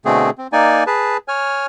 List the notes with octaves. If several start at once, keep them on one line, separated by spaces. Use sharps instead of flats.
B2 D3 A3 C4 G#4
C4
A#3 D#4 D5 G#5
G#4 B4 A5
C#5 G#5 F6